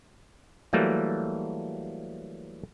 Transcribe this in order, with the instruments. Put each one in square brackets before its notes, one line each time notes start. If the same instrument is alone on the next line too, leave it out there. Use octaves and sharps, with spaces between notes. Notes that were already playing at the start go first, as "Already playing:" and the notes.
[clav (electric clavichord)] E3 F#3 G3 A3 A#3